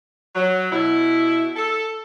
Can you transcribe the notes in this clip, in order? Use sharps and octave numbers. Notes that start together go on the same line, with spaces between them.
F#3
B2 E4
A4